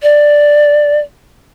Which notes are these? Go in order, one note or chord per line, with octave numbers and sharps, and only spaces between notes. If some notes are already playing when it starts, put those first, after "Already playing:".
D5